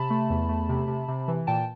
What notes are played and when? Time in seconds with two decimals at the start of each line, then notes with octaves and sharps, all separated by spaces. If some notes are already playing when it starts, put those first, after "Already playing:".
Already playing: C3 A5 B5
0.10 A3
0.30 E2
0.49 A3
0.69 C3
0.88 C3
1.08 C3
1.28 E3
1.47 A#2 G5 A5